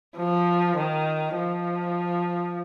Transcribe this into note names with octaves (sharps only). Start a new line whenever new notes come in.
F3
D#3
F3